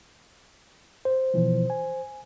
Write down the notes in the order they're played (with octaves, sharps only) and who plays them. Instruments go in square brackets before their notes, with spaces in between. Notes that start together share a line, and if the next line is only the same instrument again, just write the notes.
[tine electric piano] C5
[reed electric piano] B2 E3 F3
G#5